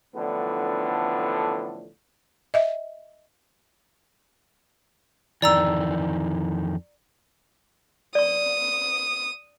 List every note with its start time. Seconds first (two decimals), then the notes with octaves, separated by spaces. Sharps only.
0.14 A1 A2 D3 F3 B3 D4
2.54 D#5 E5
5.42 F2 D#3 E3 D5 A#5 E6
8.15 D5 C#6 D#6